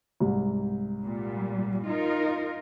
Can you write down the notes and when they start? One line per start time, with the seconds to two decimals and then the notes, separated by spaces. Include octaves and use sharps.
0.20 C2 G#2
1.01 A#2 G3
1.87 D#4 F4 A#4